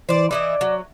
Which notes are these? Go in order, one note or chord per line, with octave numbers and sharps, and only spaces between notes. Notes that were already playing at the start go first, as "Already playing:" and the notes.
E3 C5 D5
E3 E4 D5 D#5
F#3